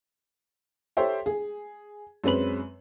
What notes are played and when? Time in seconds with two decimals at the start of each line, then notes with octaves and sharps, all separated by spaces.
0.97 G4 A4 C5 C#5 E5 G5
1.26 G#4
2.24 F#2 G#3 C4 B4 F#7